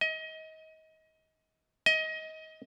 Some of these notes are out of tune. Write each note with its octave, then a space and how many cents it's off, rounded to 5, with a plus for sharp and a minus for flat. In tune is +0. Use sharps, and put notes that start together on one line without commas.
D#5 +30
D#5 +25